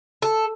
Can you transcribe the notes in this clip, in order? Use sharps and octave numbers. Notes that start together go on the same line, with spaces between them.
A4